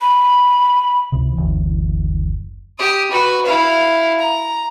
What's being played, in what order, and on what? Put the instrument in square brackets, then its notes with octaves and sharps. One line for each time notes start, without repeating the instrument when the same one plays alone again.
[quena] B5
[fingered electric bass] C#2 C3
F#1 D2 E3
[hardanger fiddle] G4 D#6
F#4 B4
E4 F5
A#5